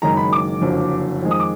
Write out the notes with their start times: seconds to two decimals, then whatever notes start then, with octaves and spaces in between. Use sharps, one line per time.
0.02 F#1 F#2 D#3 G#3 A#5
0.17 B5
0.33 D6
0.62 F#1 F2 D3 F#3
1.22 F2 D#3 G#3
1.31 D#6
1.40 D6